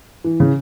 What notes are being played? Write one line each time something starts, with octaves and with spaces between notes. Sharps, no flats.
E3
C#3